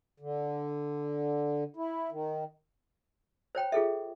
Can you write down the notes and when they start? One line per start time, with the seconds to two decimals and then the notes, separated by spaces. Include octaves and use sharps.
0.20 D3
1.76 E4
2.11 D#3
3.55 C5 C#5 G5 B5
3.72 F4 G#4 A4 E5